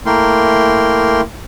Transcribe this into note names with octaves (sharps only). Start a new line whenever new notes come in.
A3 A#3 E4 A#4 G5 C6